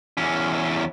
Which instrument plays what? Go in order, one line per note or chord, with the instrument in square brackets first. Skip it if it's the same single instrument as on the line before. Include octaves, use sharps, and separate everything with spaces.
[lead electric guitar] E2 C#4